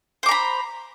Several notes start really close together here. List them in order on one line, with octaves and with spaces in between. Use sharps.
C5 D6 A#5 B5